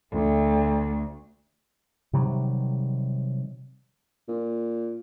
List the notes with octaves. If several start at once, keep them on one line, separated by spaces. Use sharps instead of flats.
D2 A3
C3 D#3 F#3 G3
A#2